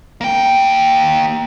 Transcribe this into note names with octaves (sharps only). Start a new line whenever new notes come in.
A#3 G5